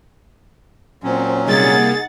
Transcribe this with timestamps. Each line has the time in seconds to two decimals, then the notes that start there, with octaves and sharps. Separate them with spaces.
1.04 A#2 F#3 C4 C#4
1.47 C3 G3 A#3 D#4 G#4 F#5 A6